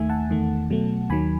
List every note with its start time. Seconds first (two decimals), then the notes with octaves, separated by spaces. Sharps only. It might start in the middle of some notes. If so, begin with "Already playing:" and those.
Already playing: D#2 D#3 A3 E5 G#5
0.09 F#5 A5
0.30 E2 D#3 A3
0.70 B2 F#3 A3
1.09 D#2 D#3 F#3 G#5 B5